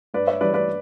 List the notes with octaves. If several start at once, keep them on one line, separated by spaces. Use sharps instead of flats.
G2 B4 D5
C#5 E5
E3 G3 B4 D5
B4 D5